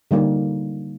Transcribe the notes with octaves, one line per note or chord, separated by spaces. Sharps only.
D3 G3 A#3 D#4 A#4